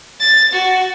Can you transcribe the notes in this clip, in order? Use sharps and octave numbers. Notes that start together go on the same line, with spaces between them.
A6
F#4